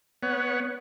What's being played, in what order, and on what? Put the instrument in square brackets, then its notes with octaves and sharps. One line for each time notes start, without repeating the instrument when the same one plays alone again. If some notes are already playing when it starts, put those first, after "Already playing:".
[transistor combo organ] B3 C#5 F#5